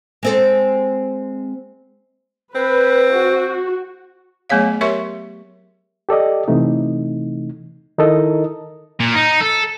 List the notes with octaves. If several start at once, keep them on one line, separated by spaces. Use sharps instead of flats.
G#3 C4 A4
C4 B4
F#4
F#3 A3 B3 G#4 C#5 F5
G4 A#4 C#5 E5 C6 C#6
G4 A4 D5 D#5
C3 E3 A3 D#4
D#3 D#4 E4 A4 A#4 D#5
A#2
D#4
A4